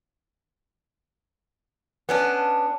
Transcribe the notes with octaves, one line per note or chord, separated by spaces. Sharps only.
B3 C#4 D4